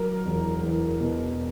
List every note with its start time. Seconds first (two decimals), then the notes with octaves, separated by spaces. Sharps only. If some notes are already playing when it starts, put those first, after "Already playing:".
Already playing: F#3 A#4
0.25 E1
0.63 E2
1.00 B2